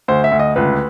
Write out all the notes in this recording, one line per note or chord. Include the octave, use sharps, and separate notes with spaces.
D2 C5
E5
D2
D#5
C#2 B4